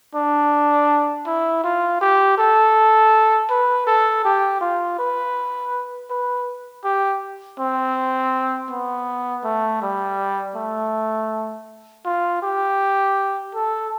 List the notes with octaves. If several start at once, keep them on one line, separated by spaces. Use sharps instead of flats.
D4
E4
F4
G4
A4
B4
A4
G4
F4
B4
B4
G4
C4
B3
A3
G3
A3
F4
G4
A4